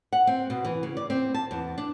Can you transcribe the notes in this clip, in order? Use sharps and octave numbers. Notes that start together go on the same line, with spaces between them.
F#5
C4
B2
E3
C#3
D5
C4
A5
E2
D4